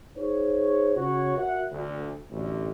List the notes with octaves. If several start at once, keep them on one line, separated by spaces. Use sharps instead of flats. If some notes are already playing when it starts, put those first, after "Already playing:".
D#4 G#4 C5 C#5
C#3 F#4 C#5
F#4 A#4 E5 F#5
D2
A1 D2